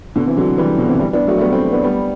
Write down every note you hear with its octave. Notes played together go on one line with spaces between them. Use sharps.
B2 D3
C3 E3
D3 F#3
E3 G3
B2 D3
C3 E3
E3 G3
B3 D4
F#3 A3
A3
G3 B3
A3 C4
B3 D4
G3 B3